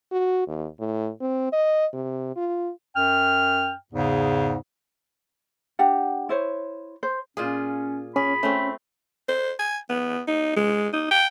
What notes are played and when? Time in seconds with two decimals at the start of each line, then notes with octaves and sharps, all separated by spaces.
0.12 F#4
0.47 D#2
0.80 A2
1.21 C4
1.53 D#5
1.94 C3
2.36 F4
2.96 F#2 G5 F6
3.93 E2 G#2 C#3
5.79 D4 G4 F#5
6.29 E4 C5 C#5
7.03 C5
7.37 A#2 C#4 F4 G#4
8.16 C#4 G#4 B5
8.43 A3 C4 C#4
9.29 C5
9.59 G#5
9.89 B3
10.27 D#4
10.56 G#3
10.93 D#4
11.11 G5